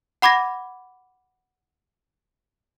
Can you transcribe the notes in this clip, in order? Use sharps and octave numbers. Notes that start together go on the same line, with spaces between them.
F#5 B5 D6 G#6 A#6